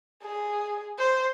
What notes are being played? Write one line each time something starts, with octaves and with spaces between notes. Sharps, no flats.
G#4
C5